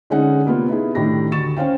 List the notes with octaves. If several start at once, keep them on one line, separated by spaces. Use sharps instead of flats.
D3 G#3 C#4 D#4 F#5
C3 A#3 B3 F4
B3 D#4 E4 G#4
A2 D#3 D4 G4 A#6
D2 C#6 A6 E7
C#4 C5 F5 G5